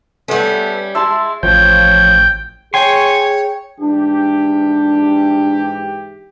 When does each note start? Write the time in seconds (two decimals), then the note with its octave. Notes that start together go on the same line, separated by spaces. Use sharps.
0.28 G3 A3 B3 C#4
0.95 G#3 E4 E5 A5 C6
1.43 A1 F3 C#5 G5
2.74 G#4 C#5 G5 G#5 C6
3.80 G#2 E3 D4 G4